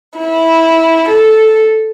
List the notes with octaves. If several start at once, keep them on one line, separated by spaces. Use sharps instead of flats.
E4
A4